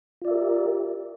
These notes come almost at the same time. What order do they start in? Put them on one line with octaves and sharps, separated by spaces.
F4 D5 E5 A#4 G4